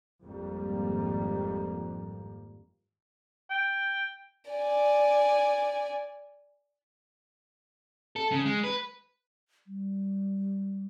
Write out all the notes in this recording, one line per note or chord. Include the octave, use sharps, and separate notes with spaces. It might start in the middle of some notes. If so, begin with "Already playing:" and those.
G#1 F2 F3 G3 A#3
G5
D5 G#5
A4
C#3
G#3
B4
G3